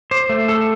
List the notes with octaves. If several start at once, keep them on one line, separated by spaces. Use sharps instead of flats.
C5 D6
A3
A4 E6